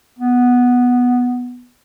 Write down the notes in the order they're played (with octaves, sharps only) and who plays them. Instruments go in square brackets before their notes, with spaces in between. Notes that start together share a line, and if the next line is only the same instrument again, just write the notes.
[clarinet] B3